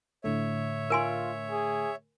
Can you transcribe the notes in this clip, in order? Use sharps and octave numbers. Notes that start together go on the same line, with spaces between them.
A2 D3 A3 C#5 E5
F4 A#4 G#5 C6
G#4